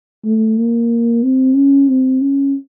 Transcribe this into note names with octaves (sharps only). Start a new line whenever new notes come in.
A3
A#3
C4
C#4
C4
C#4